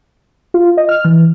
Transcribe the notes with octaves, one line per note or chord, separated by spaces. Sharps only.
F4
D#5
F6
E3